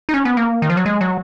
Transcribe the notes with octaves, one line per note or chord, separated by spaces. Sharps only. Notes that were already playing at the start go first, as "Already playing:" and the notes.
D#4
C#4
B3
A#3
D#3
F3
F#3
G#3
F#3